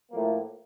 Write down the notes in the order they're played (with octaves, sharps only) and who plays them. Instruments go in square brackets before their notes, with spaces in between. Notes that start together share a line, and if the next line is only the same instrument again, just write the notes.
[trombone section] A2 F3 A#3